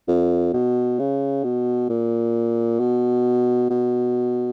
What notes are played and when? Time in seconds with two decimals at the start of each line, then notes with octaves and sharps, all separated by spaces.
0.08 F2
0.53 B2
0.99 C#3
1.44 B2
1.89 A#2
2.79 B2
3.70 B2